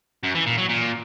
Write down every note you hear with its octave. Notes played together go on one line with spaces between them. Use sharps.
F#2
E3
A#2
F#3
A#2